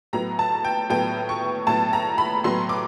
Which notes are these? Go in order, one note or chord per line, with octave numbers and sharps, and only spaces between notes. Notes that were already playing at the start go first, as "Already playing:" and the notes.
A2 F#3 B3 A#5
A5
G5
A2 F#3 B3 G5
C#6
A2 F#3 B3 A5
A#5
B5
A2 F#3 B3 C6
D6